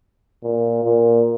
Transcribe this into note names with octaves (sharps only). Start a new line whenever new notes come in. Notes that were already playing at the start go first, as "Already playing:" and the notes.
A#2
A#2